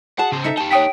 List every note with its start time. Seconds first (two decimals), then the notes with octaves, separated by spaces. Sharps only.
0.18 F#4 G#4 F#5 A5
0.32 C#3 C5
0.44 D#4 A4 E5 C#7
0.57 D#4 G4 A5
0.71 C#5 G5 D#6 B6